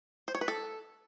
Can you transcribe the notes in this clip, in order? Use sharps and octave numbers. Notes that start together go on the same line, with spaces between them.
C5
C#5
B4
A4